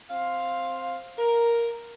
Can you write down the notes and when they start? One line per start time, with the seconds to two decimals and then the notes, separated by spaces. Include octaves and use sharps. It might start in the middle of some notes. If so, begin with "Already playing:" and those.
0.10 C4 F5
1.17 A#4